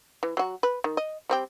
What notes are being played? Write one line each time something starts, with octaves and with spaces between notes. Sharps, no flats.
E3
F#3 F#4
B4
D#3
D#5
G3 C4 G4